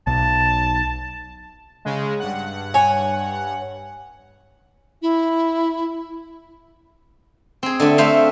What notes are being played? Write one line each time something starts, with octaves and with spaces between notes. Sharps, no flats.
B1 A5
C#3 G#3
G2 F#5
C#5 G#5
E4
C4 G#4
D3 A3 D4
A3 C4 C5 E5 F5